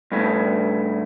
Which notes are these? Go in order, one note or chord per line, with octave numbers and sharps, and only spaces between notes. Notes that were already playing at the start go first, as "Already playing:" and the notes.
G2 C#3 A3